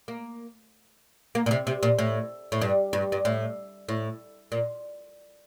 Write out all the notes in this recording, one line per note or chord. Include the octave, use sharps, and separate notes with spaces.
A#3
A#3
A#2
C3
C3
A#2
A2
A2
G2
G2
G2
A2
A2
A#2